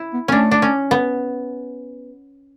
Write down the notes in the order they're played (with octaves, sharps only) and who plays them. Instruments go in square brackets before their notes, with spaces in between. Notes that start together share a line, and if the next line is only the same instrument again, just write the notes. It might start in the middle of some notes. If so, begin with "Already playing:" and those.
Already playing: [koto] E4
[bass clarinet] B3
[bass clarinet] B3 [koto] C#4
[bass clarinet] A3 [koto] D4
[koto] D4
C#4
B3